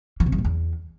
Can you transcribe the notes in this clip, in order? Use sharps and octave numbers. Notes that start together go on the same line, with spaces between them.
E3
C3
G2
A#2
E2